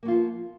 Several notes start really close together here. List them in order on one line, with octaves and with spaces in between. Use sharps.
A#3 F#3 F4 F3 B3